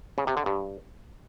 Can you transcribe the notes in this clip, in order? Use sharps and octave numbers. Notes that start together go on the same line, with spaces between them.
C#3
C3
D3
G2